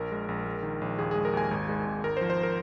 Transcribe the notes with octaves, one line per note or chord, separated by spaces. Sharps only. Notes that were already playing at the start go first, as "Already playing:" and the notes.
Already playing: A#1 A#4
G#3
A#1
G#3
D#3
A#1
D#2 G#4
G#4
G#3
A#4
D#2 G#5
G#1
G#3
G#1
G#1 A#4
C5
F3
C5
A#4